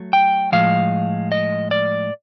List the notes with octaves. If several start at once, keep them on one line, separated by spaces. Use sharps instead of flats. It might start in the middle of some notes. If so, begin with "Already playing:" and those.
Already playing: F#3 A3
G5
A2 F3 G#3 F5
D#5
D5